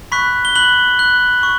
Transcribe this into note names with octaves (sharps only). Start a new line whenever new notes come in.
B5 C#6 F#6 B6
G7
B5 F#6 F#7
F#6
C#6